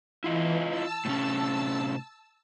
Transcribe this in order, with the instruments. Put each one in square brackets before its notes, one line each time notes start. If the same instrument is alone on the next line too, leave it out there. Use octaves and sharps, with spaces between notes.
[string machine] E3 [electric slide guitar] E4 F4 D#5
[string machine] A5 E6
[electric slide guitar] A2 C3 C#4